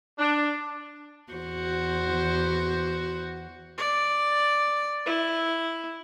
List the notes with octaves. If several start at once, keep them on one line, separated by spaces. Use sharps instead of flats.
D4
E2 F#4 C5
D5
E4